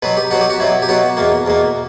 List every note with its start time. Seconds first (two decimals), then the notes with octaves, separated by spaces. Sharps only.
0.03 B2 F#3 B3 B4
0.17 G4
0.31 B2 F#3 B3 F#4
0.41 G4
0.50 F#4
0.60 B2 F#3 B3 E4
0.82 G4
0.88 B2 F#3 B3 F#4
1.17 E2 B2 A#3
1.46 E2 B2 A#3